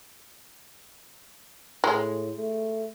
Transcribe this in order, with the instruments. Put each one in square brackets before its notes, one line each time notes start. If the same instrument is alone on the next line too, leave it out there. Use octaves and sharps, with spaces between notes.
[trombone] A2 [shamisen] G#3
[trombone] A3